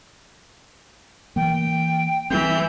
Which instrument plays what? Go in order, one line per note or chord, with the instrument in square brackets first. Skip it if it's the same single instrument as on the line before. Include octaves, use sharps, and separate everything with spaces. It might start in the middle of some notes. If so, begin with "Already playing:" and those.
[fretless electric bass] E3 A#3 [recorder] G5
[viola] E3 [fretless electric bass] G3 A#3 C4 [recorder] G6